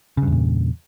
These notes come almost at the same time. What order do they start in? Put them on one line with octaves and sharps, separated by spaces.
C#3 G2 E2 A#2